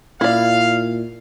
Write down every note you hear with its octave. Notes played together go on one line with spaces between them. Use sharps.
A#2 E4 D5 F5